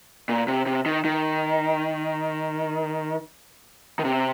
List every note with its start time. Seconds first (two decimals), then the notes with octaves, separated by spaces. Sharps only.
0.29 A#2
0.48 C3
0.66 C3
0.86 D#3
1.05 D#3
3.99 D#3
4.05 C3